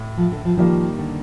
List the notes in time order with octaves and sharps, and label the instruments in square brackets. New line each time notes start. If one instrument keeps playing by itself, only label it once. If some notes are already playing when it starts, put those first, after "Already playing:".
Already playing: [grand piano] A2
[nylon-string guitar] F3
D3
F3
[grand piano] D#3 G3 A#3 [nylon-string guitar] F3
[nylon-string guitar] D3